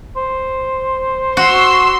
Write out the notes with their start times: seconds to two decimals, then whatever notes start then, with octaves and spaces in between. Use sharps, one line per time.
0.16 C5
1.37 F#4 C6 C#6 E6